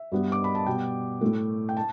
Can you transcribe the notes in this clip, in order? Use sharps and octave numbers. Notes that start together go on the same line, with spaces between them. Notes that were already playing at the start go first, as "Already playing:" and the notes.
Already playing: E5
G2 G3 B3
D6
B5
A5
B2 G3 B3 G5
A2 A3
G5
A5